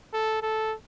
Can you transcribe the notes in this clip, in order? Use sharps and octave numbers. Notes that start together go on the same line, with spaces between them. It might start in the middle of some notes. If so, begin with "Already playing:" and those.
A4
A4